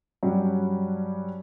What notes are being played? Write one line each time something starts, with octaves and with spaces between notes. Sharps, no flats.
G2 F#3 C#4 G4